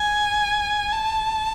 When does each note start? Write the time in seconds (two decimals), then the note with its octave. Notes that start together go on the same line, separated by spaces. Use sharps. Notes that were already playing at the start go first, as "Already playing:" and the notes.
Already playing: G#5
0.93 A5